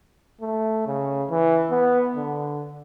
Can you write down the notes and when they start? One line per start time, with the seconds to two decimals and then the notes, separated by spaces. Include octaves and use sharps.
0.41 A3
0.87 C#3
1.30 E3
1.71 B3
2.16 D3